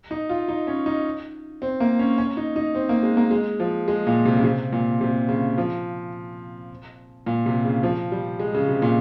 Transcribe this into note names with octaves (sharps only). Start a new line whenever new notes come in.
D#4
F4
D#4
C#4
D#4
C4
A#3
C#4
C#4
D#4
D#4
C4
A#3
G#3
A#3
G#3
F3
G#3
A#2
C3
C#3
C3
A#2
C3
C#3
F3
A#2
C3
C#3
F3
G3
G#3
C#3
C3
A#2